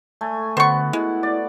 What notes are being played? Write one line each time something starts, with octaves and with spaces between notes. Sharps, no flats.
A3 G#5
D3 B3 F#4 C5 C#6
G#3 E4
D5